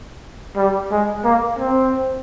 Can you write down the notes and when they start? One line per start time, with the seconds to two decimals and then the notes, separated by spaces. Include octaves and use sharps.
0.56 G3
0.91 G#3
1.24 A#3
1.59 C4